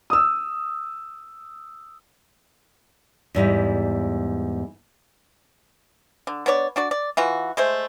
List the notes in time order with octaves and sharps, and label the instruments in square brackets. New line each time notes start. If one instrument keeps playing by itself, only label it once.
[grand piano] D#6 E6
[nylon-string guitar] E2 G#2 G3 E4
[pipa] D3
B3 D4 C#5 D5
D4 F#4 D5
D5
E3 F4 F#4
G#3 A3 C5